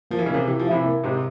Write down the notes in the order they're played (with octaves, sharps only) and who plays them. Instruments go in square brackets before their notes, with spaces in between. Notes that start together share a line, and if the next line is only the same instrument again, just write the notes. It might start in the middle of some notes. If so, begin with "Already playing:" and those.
[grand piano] F3 [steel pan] A#3
[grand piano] E3
C#3
[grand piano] C3 E3 [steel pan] A#3
[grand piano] E3 [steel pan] G4
[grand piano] F3
[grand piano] C3 E3 [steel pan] E4
[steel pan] A#3
[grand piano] G#2 C3 [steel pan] G4